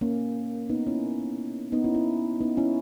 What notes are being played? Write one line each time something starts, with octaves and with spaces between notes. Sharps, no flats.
A#3 C#4
B3 D#4
C#4 E4
B3 D#4
C#4 E4
C#4 E4
B3 D#4
C#4 E4